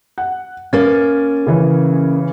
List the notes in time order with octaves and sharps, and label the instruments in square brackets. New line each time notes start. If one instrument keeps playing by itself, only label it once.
[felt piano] F#5
[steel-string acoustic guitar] A#3 C#4 [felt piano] A6
[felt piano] C#3 E3